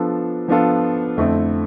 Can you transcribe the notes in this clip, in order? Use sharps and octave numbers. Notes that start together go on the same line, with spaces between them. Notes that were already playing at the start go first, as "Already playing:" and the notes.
Already playing: F3 B3 D4 F4 A4
F3 B3 D4 F4 A4
F2 D3 A3 C4 E4